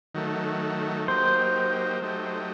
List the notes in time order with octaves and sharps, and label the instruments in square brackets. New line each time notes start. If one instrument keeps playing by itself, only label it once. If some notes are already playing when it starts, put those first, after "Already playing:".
[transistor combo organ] D#3 F#3 A3
[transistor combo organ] F#3 A#3 D#4 G4 [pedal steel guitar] C5
[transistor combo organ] F#3 A3 D#4 G4